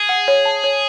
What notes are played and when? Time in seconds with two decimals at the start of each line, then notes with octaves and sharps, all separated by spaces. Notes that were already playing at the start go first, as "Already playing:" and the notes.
Already playing: G#4
0.09 F#5
0.28 C#5
0.45 A5
0.64 C#5